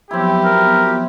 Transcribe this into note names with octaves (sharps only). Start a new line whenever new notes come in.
F3 F#3 B3 C4 E4 G4
A#4